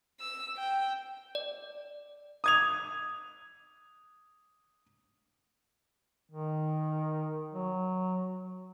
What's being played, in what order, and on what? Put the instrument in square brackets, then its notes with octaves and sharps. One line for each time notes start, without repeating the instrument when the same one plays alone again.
[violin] E6
G5
[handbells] D5
[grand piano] D#6 G#6 F7
[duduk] D#3
F#3